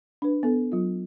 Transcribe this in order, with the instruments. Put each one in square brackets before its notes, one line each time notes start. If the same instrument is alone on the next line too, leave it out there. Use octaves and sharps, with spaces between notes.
[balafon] D4 B4
B3 A4
F#3 F4